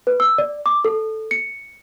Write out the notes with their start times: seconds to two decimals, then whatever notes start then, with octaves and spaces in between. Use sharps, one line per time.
0.07 B4
0.20 E6
0.38 D5
0.66 D6
0.85 A4
1.31 C#7